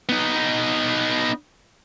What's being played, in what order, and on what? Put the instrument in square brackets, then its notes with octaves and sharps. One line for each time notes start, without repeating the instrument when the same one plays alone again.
[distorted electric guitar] B3 D#4